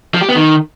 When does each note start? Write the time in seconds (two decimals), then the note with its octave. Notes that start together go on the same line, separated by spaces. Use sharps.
0.14 F3
0.21 G4
0.29 B3
0.36 D#3